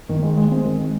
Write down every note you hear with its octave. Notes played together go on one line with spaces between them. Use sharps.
D#3
G#3
G#3
C4
D#3
G#3